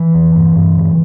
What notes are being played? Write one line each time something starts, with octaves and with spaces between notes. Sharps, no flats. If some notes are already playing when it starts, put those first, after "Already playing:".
Already playing: E3
E2
G2
G2
D3